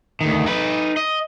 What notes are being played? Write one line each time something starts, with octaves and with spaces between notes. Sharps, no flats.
D2 D#3
D#4 B4
D#5